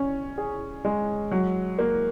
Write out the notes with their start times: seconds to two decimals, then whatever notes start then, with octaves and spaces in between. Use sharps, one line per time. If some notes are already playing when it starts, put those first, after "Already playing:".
Already playing: C#4
0.38 G#4
0.85 G#3
1.31 F#3
1.79 A#3